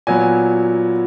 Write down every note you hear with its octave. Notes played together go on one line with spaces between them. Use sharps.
A#2 F#3 B3 G#5